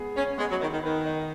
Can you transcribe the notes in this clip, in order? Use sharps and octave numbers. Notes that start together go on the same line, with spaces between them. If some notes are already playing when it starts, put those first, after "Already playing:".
Already playing: G#3 B3 G#4
C#4 C#5
G#3 B3
F#3
D#3 D#4
D#3
D#3 B4
D#5